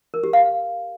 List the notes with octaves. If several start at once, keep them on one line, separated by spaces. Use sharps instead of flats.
A#4
G4
F5